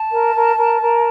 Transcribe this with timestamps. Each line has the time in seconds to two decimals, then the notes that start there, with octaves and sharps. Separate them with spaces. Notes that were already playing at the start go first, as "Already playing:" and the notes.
Already playing: A5
0.10 A#4
0.34 A#4
0.57 A#4
0.80 A#4